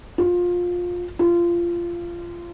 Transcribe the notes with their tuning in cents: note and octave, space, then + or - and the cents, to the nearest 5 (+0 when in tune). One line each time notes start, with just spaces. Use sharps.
F4 +20
F4 -20